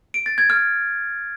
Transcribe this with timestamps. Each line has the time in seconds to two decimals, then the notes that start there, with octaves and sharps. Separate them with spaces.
0.14 D7
0.26 A6
0.38 G#6
0.50 F6